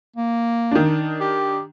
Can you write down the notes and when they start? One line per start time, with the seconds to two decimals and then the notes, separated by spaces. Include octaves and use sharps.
0.16 A#3
0.71 D#3 D4
1.20 G4